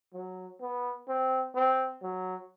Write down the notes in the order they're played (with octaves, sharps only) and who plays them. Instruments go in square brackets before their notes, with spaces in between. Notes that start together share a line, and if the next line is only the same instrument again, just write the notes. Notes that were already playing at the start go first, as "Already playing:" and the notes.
[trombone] F#3
B3
C4
C4
F#3